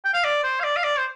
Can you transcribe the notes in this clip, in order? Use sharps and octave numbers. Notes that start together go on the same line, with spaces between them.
G5
F5
D5
C5
F5
D5
F5
D5
C5